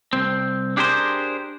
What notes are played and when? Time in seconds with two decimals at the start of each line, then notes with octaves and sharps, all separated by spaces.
0.13 C2 C4
0.77 D4 G4 G#4 A#4 C5